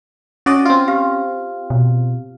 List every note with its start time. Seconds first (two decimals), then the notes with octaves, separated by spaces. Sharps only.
0.46 C#4 F#4 D5 D#5
0.65 C4 F4
0.88 G4 F5 F6
1.70 B2